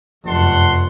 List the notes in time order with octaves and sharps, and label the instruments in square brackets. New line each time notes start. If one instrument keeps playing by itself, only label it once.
[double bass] F1 F#2 [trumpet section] F#5 A5 C6